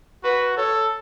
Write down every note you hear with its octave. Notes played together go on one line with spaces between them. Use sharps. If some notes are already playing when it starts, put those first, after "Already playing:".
F#4 B4
A4 C#5